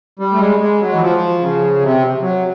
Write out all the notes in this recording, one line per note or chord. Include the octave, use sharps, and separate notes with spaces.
G3
A3
G#3
G#3
F#3
E3
F3
C#3
C3
F#3